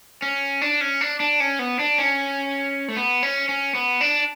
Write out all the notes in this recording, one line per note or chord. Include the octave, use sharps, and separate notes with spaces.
C#4
D4
C#4
D4
D4
C#4
B3
D4
C#4
A3
B3
C#4
C#4
B3
D4